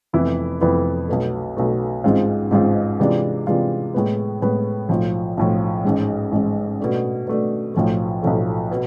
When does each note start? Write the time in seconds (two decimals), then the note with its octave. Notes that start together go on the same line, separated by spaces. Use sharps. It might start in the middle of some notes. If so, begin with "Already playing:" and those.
0.13 F1 F2 E3 B3 E4
0.61 F1 F2 E3 B3 E4
1.08 B1 B2 A3
1.57 B1 B2 A3
2.04 A1 G#2 G#3 C4 F4
2.51 A1 G#2 G#3 C4 F4
3.00 C3 E3 G#3 D4 F4
3.47 C3 E3 G#3 D4 F4
3.94 A2 G#3 B3
4.42 A2 G#3 B3
4.89 B1 A2 F3
5.37 B1 A2 F3
5.85 A1 G#2 G#3
6.32 A1 G#2 G#3
6.80 B2 A3 D4
7.27 B2 A3 D4
7.75 B1 A2 F3 A3
8.23 B1 A2 F3 A3
8.71 B2